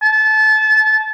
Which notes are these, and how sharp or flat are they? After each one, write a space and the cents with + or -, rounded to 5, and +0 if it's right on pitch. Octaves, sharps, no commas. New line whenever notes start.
A5 -25